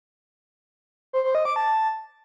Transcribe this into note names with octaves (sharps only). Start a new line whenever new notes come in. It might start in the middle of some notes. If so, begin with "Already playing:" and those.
C5
C5
D#5
D6
A5